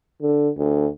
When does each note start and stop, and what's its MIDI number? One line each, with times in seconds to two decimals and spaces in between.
0.22 0.49 50
0.57 0.87 38